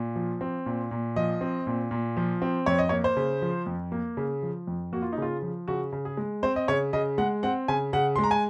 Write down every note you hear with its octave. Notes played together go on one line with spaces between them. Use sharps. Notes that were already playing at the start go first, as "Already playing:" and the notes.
Already playing: A#2
F3
C4
A#2
A#2
F3 D#5
C4
A#2
A#2
F3
C4
F2 C#5
D#5
A#3 C#5
C5
C#3
F3
F2
A#3
C#3
F3
F2
A#3 F#4
F4
D#4
C#3 F4
F3
C#3 F#4
C#3
G#4
G#3
C4 C5
D#5
C#3 C#5
C#3 D#5
G#3 F#5
C4 F#5
C#3 G#5
C#3 F#5
C6
G#3
A#5
G#5